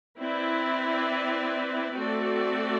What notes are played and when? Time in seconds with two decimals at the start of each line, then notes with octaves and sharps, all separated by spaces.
0.20 C4 E4 B4 D5
1.96 A3 C4 F#4 A4 D5